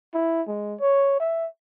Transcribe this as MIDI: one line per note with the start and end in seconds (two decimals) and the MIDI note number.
0.14 0.42 64
0.48 0.75 56
0.80 1.15 73
1.20 1.47 76